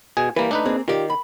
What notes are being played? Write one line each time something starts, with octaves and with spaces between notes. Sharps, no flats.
B2 G#4
E3 G3 A#3 B4
A3 D4 D#4 B4
A#3 C4 G#4
D#3 F4 G4 D5
B5